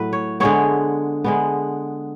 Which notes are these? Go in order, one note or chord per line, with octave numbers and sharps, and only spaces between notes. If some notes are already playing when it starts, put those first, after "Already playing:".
Already playing: A2 F#3 A3 B4
C#5
D3 G#3 B3 C#5
D3 G#3 B3